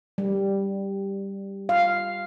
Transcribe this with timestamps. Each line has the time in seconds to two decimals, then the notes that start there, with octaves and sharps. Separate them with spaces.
0.18 G3
1.69 F5